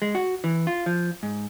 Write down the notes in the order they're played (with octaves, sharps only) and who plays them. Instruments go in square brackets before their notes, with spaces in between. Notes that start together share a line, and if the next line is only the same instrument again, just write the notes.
[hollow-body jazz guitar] G#3
F#4
E3
F4
F3
G#2